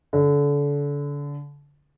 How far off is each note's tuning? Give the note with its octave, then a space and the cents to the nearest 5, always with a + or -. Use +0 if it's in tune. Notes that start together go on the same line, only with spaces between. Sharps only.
D3 -30